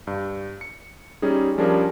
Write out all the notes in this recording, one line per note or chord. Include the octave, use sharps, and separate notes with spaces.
G2
C#7
G3 C#4 D#4 G#4
F3 G3 C#4 D4 G#4 A#4